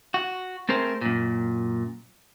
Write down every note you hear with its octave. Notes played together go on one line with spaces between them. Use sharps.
F#4
A3 C4 G#4 A#4 C5
F#2 A#2